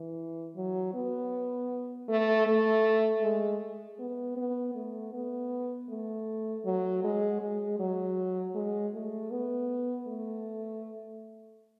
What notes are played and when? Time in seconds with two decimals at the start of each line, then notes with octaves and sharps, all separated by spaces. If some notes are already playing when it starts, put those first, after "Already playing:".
Already playing: E3
0.56 F#3
0.94 B3
2.09 A3
2.47 A3
3.22 G#3
3.99 B3
4.37 B3
4.75 A3
5.13 B3
5.89 A3
6.65 F#3
7.04 G#3
7.41 G#3
7.80 F#3
8.55 G#3
8.94 A3
9.31 B3
10.07 A3